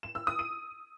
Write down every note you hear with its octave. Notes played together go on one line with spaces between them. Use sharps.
E7
E6
D#6
D#7